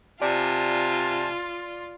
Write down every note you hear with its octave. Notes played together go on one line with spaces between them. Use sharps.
C3 F4 D5 G#5 A5